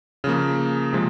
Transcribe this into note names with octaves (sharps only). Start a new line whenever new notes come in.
C#3 F3 A#3
C3 F3 G#3